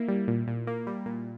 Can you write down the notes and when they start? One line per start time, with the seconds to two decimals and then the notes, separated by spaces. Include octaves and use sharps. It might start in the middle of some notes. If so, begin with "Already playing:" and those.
Already playing: A#3 E4
0.08 G3
0.28 A#2
0.47 A#2
0.67 A#3
0.87 G3
1.06 A#2